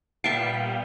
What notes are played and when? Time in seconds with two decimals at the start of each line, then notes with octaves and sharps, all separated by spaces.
0.24 A#2 G3 B3 E5 F5 G5 A5